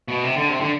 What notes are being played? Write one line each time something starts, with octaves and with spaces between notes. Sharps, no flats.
B2
C3
D3
C3
D3